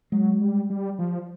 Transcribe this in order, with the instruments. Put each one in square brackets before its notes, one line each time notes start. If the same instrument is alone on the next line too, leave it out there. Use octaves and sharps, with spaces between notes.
[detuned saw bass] F#3 [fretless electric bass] G#3
[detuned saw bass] G3
G3
F3